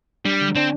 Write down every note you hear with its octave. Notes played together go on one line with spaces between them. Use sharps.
G3 D4
D3
C4 D4